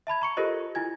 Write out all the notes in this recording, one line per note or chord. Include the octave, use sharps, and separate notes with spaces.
E5 A5 B5 G#6
A#5 C#6 C#7
F4 G4 A4 A#4 C5 D#5
E4 F4 G#5 G#6